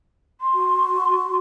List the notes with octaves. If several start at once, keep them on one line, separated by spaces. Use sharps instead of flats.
C6
F#4